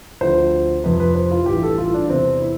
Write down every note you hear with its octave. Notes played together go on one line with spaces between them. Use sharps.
D2 D3 F3 C5
F1 F2 C3 B4
B4
C5
F4
A1 G2 E3 G4
A4
F4
D4
E2 C3 E3 C4
E4